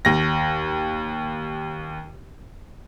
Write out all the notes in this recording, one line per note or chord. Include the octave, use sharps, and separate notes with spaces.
D#2 A#6